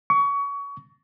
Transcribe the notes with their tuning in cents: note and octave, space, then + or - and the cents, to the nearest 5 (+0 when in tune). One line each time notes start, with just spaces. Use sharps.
C#6 +25